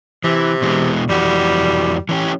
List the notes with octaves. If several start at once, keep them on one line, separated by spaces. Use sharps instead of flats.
C3 E3
B2 E3 G#3
F2 E3 G3 F#4
E3 C#4 G4